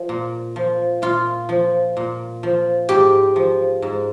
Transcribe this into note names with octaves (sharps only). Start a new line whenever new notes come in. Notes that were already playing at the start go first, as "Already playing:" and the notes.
Already playing: F3
A#2
F3
A#2 F4
F3
A#2
F3
G#2 G4
F3
G#2